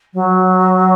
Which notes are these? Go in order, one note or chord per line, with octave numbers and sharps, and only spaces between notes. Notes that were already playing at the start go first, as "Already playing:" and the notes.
F#3